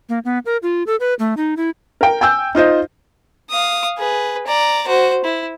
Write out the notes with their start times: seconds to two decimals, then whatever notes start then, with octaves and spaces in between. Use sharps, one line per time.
0.09 A#3
0.25 B3
0.46 A#4
0.63 F4
0.87 A4
1.00 B4
1.19 A3
1.37 D#4
1.57 E4
2.01 A#4 G5
2.21 G5 G#5 E6 G6
2.55 D#4 F4 C5 D#5
3.50 F5 D#6
3.98 G#4 B4
4.47 D5 A#5
4.88 F#4 C5
5.24 E4